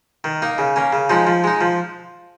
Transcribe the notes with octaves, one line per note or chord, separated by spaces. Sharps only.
D#3
A#3 D#4
C#3
A#3 C#4
C#3
F3 G#3 D#4
F3
G#3 D#4
F3